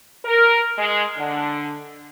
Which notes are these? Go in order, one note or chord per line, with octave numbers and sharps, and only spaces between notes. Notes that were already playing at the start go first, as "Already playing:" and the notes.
A#4
G#3
D3